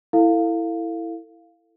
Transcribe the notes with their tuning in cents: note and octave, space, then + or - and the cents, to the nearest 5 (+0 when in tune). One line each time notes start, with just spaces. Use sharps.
E4 +0 A4 +25 F5 +0